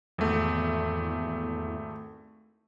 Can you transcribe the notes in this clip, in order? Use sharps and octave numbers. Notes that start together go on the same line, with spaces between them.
G#1 E2 A3